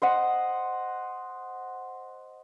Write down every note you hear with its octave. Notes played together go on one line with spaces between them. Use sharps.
C5 D#5 F#5